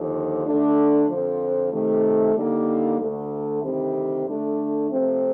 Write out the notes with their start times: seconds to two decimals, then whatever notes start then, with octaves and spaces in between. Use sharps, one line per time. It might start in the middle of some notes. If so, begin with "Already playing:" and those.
Already playing: D#2 D3 F3
0.45 D3 A3 D4
1.09 F2 D3 F3
1.72 C3 D#3 A3
2.35 D3 G3 A#3 D#4
2.99 D2 D3 A3
3.62 D2 C3 D#3 G3 C4
4.26 D3 A3 D4
4.89 C3 F3 A3 C4